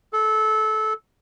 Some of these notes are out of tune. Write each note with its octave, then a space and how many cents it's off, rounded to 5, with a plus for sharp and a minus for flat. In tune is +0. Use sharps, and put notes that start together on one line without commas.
A4 -20